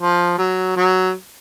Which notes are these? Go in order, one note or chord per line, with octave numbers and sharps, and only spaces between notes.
F3
F#3
F#3